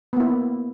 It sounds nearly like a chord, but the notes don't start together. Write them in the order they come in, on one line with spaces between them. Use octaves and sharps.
B3 A#3 E4